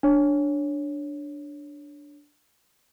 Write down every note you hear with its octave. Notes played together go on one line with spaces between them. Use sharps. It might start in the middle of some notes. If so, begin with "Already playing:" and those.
D4 C#5